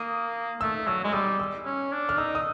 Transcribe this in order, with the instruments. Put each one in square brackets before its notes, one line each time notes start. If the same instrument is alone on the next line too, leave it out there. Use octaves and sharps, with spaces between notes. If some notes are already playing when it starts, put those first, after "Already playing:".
Already playing: [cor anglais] A#3 [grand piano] D#6
[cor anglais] A3 [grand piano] E6
[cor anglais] F#3 [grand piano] E6
[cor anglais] G#3
[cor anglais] G3 [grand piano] D#6
[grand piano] E6
[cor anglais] C#4
D4
[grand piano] F6
[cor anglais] D#4 [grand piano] E6
[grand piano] D#6